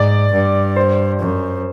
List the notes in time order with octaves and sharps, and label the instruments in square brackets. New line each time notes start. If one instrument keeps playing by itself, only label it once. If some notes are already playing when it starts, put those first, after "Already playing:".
Already playing: [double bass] G#2 [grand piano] D5
[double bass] G2
[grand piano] C5
[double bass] F#2